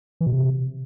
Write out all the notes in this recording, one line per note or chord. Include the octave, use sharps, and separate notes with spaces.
E3
B2
C3